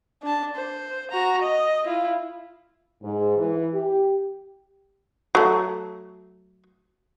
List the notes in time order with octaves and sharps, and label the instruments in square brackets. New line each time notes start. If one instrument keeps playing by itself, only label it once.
[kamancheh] D4 A5
C5
F#4 A#5
D#5
E4 F4
[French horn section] G#2
E3
G4
[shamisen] F#3 A3